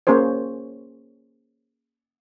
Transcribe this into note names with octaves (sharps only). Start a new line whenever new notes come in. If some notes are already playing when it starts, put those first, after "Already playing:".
A#3 C#4 G#4 C5 C#5